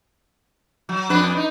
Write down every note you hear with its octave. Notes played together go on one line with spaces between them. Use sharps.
F#3
F2 D4 B4
D#4